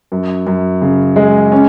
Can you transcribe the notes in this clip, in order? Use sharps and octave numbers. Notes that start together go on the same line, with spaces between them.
F#2
F#2
C#3
G#3
C#4